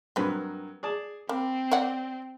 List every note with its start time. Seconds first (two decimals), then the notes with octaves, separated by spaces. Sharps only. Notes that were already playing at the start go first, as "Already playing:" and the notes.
0.16 G2 F#3 A#3 C4 B4
0.83 G#4 D5 A5
1.29 A#3 C4 B5
1.71 C#5 D5 F#5